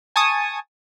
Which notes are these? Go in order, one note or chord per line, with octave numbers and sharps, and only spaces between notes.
G#5 A5 C#6 D#6